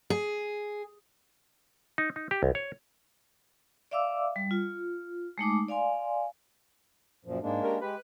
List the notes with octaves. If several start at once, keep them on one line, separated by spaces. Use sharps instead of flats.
G#4
D#4
D#4
G4
C2
C#5
D5 E5 F5 D6 E6
G3
F4
G#3 A3 D#4 D6
D5 F5 G#5 C6
F#2 A#2 F3
G#2 G#3 A#3 D4
C#4 G4 A#4
G#3 G4 B4